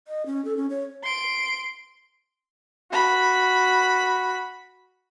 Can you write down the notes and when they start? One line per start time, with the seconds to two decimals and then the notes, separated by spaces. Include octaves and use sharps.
0.08 D#5
0.26 C#4
0.45 A4
0.57 C#4
0.70 C#5
1.04 C6 D7
2.92 F#4 B5